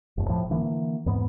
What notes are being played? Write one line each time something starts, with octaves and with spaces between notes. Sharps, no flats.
F1 F2 A2
A2 F3
D3 E3 G#3 A#3
E2 G#2 B3